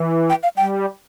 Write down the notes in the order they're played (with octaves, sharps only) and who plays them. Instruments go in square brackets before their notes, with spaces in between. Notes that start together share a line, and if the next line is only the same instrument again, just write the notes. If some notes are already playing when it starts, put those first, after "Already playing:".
Already playing: [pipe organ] E3
[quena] G5
F5
[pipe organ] G3 [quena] G5